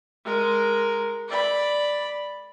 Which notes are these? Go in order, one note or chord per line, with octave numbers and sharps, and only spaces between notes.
G#3 A#4
D5 B5